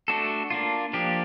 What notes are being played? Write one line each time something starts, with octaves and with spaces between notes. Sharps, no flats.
A3 D4 F#4 A4
A#3 D4 F4
F3 A#3 D4 G4